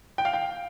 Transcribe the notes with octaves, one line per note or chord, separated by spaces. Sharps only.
G5
F5
G5